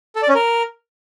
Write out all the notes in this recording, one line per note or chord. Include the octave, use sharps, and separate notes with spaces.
A4
D5
C#4
A#4